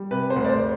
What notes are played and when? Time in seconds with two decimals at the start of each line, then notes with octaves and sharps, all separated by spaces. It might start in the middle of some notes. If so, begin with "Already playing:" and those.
Already playing: G3
0.11 C3 B4
0.30 C5
0.36 D2
0.45 D5
0.49 C5